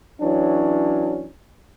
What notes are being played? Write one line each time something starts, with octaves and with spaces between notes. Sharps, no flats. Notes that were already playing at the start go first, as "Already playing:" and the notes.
E3 F#3 C#4 D4